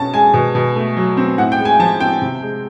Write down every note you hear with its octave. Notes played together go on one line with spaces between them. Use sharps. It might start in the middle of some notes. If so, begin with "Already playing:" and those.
Already playing: B2 C#4 A5
G#3 G#5
B2
B2
A3
F#3
C4
A2 F#5
G5
G#3
G#5
F3 A5
C4 G5
C3
G#3